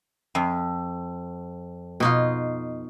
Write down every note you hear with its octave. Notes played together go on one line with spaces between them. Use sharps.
F2
B2 D#4 F4